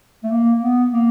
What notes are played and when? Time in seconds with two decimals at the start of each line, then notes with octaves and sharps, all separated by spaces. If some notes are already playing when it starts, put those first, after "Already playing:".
0.23 A3
0.30 A#3
0.62 B3
0.93 A#3